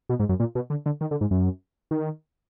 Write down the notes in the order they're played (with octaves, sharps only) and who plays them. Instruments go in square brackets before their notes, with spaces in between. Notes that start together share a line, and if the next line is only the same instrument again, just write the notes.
[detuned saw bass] B2
G#2
F#2
A#2
B2
D3
D3
D#3
D3
G#2
F#2
D#3